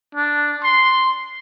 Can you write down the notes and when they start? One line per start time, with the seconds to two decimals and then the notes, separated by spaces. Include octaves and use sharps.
0.15 D4
0.64 C6